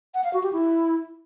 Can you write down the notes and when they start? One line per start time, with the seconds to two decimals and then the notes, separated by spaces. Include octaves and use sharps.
0.14 F#5
0.24 F5
0.34 F#4
0.43 G4
0.53 E4